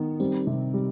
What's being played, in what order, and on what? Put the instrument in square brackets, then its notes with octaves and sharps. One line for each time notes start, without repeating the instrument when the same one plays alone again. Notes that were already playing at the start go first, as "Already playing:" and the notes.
Already playing: [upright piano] D#3 [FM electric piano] B3
[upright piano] G3 [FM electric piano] C4
[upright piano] C3
G3